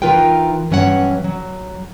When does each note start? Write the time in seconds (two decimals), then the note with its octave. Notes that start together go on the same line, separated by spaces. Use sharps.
0.02 E3 D#4 F4 A#4 B4 G5
0.70 G2 E3 F#3 C#4 C#5 F#5
1.24 F#3